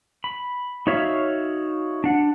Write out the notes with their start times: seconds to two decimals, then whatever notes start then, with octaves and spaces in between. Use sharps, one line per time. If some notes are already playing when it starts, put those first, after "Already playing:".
0.24 B5
0.87 D#4 F#4 C#5 E5 F5
2.04 D4 F#5